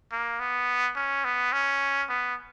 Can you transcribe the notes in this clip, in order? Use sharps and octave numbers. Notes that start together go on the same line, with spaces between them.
A#3
B3
C#4
B3
C#4
B3